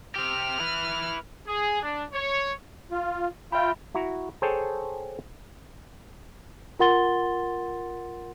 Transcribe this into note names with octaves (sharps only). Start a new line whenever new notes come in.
C4 G4 F6
E4 B4
G#4
D4
C#5
F4
F4 E5 G5 B5
E4 F#4 A#5
G#4 A4 C5 C#5 G5 A5
F4 A#4 F#5 C6 A6 G7